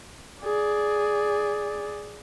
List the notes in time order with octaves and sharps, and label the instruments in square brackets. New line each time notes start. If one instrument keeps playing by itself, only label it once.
[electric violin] G#4 D5